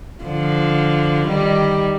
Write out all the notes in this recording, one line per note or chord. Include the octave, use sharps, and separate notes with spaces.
D3 F3
D#3 G3